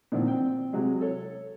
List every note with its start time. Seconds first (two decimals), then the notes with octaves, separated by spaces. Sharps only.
0.12 A#2 D3 D#3 F3 C4
0.28 C4 G5
0.73 C3 F#3 G#3 C4
1.01 A4 C#5